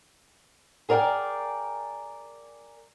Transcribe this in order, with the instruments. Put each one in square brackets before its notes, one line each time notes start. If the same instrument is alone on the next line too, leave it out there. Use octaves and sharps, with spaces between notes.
[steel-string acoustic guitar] G#4 A#4 D5 F#5 G5